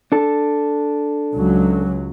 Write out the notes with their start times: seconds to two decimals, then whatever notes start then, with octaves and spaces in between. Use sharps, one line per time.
0.12 D4 A4
1.33 C#2 F#3